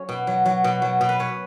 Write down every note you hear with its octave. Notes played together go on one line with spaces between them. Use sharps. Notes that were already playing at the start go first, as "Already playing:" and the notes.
Already playing: F#3 C#4 A4 C#5
B2
F#3
F#3
B2
F#3
B2
B4
C#4 C#5